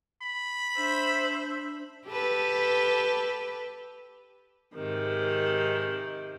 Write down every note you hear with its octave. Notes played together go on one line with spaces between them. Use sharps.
B5
D4 C5 E5
G4 A4 B4
G#2 C3 D#3